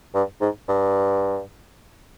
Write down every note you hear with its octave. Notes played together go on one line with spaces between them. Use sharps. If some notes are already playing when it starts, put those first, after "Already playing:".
G2
G#2
G2